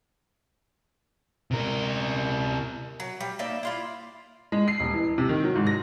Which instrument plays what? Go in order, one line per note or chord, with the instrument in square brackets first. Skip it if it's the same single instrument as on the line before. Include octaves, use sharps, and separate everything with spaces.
[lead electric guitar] C3 A#4
[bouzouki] F#3
G3
A#3 D#4 D5 E5
E4 F4 D5
[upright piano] G#3
C7
D#1
E3
C3
D#3
F#3
G#2
A#6